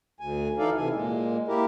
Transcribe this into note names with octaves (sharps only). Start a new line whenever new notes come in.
D2 G#5
E3 D#4 A4 D5 F5
C3 E3 G#5
A#2 G#3
A#3 E4 G4 A#4